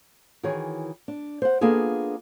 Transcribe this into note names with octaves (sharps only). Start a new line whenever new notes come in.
D#3 E3 F#4 G#4 C#5
D4
C5 F#5
A#3 B3 D4 F4 G#4 A4